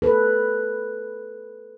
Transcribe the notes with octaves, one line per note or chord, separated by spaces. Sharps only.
A4 B4